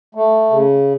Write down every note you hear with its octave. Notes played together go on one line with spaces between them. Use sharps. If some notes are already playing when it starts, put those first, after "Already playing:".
A3
C#3